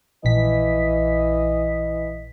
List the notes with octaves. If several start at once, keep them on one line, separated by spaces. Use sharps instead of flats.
A#1 E3 D#5 B6